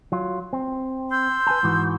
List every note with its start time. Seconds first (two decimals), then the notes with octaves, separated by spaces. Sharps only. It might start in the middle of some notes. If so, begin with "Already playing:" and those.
0.12 F#3 F4
0.53 C4
1.10 C6 E6 G6
1.47 B4 G#5 A5
1.63 G#2 E3 F#4